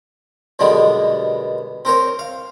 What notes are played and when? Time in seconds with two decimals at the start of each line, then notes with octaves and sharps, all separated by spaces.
0.59 F#2 B2 D3 G3 G#3 B3
1.85 C4 A#4 C5 C#5
2.19 F5